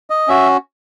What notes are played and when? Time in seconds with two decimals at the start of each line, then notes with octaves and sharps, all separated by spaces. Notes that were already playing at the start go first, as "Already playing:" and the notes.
0.10 D#5
0.28 C#4 F#4 E5